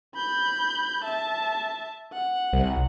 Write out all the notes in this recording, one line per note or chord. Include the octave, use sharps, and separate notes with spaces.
B5 G6
E5 A5
F#5
C2